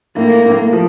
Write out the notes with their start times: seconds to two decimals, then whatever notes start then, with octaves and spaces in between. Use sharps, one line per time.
0.16 A2 A#3
0.45 A2
0.73 F3